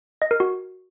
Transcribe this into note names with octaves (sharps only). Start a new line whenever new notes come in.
D#5
A#4
F#4